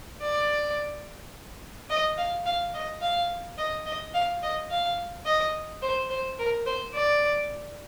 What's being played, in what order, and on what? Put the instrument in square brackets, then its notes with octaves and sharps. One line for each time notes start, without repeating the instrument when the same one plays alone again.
[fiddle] D5
D#5
F5
F5
D#5
F5
D#5
D#5
F5
D#5
F5
D#5
C5
C5
A#4
C5
D5